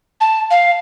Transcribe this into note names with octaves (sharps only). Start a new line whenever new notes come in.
A5
F5